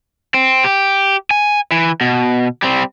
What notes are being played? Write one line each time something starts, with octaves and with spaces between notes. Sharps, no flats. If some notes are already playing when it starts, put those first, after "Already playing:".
C4
G4
G#5
E3
B2
G3 C4